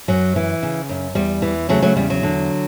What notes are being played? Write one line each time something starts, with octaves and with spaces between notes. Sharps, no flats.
F#2 F#3
E3
C#3
F#2
E2 G3
E3
C#3 F#3 A3
F#3 A3
E2 G3
F#3
D3